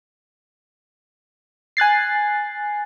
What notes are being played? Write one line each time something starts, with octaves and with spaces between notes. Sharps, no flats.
G#5 F#6 A6 C7